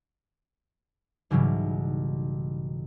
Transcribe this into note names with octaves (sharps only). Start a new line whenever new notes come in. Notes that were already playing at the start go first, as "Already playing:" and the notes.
B1 G#2 C#3 E3 G3